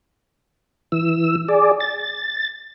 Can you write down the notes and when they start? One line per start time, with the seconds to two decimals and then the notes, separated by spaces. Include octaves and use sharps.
0.92 E3 E6
1.49 G#4 D5
1.80 A6